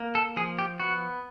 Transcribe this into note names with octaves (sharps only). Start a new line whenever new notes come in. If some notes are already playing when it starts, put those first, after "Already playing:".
Already playing: A#3
A4
F3 G#4
G4
B3 F#4